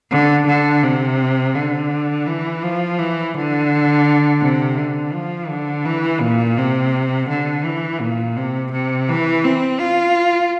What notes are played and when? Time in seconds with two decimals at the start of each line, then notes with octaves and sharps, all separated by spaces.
0.11 D3
0.47 D3
0.83 C3
1.54 D3
2.26 E3
2.63 F3
2.98 E3
3.34 D3
4.42 C3
4.78 D3
5.14 F3
5.50 D3
5.86 E3
6.21 A#2
6.58 C3
7.29 D3
7.65 E3
8.01 A#2
8.37 C3
8.73 C3
9.09 E3
9.44 C4
9.80 F4